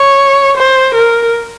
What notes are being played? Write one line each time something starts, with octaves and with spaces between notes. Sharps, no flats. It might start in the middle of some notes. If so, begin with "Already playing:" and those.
Already playing: C#5
C5
A#4